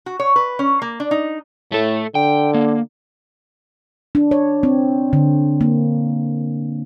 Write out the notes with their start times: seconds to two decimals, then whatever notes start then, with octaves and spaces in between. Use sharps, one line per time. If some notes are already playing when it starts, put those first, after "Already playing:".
0.06 F#4
0.20 C#5
0.36 B4
0.59 C#4
0.82 A#3
1.00 D4
1.11 D#4
1.72 A2 A3 A4
2.15 D3 G5
2.54 A#3
4.15 D4
4.31 C#5
4.63 C4
5.13 D3
5.61 A#3